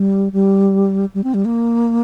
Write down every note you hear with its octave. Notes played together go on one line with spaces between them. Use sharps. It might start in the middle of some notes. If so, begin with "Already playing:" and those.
Already playing: G3
G3
G3
C4
G3
A#3